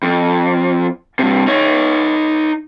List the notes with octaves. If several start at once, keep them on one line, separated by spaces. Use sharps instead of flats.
F2
G2 C3
D#4 C#5